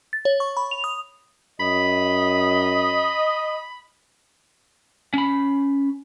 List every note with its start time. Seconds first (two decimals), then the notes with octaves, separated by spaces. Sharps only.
0.13 A6
0.25 C#5
0.40 C#6
0.57 B5
0.71 F7
0.84 D#6
1.60 F#2 D#5 B5
5.14 C#4 B5